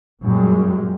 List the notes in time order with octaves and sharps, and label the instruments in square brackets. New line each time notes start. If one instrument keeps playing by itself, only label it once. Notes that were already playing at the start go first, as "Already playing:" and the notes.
[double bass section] F#2 A#2 G3 G#3